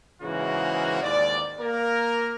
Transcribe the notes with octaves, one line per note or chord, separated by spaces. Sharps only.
G#2 C#3 E3 A#3 F#4
D#2 G#2 D5
A#3 A#4